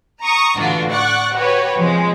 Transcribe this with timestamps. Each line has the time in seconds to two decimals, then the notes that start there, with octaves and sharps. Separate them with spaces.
0.22 A#5 C#6 D#6
0.58 A2 D3 E3 D4 F4 F#4
0.89 D5 F#5 C#6 F#6
1.34 F#4 G4 B4 C#5
1.77 C3 F3 G#3